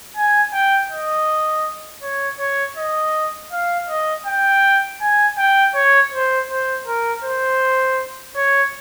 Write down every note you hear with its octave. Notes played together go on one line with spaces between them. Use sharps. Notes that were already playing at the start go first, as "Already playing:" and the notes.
G#5
G5
D#5
C#5
C#5
D#5
F5
D#5
G5
G#5
G5
C#5
C5
C5
A#4
C5
C#5